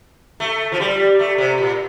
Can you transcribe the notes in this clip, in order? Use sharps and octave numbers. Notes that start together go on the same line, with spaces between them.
A3
F3
G3
A3
C3
A#2